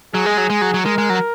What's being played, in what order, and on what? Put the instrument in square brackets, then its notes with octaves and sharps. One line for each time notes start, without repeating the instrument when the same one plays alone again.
[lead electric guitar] F#3 [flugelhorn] G#4
[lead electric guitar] G#3
F#3
G#3
F#3
F#3
[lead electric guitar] G#3 [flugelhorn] A#4
[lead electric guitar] G#3
F#3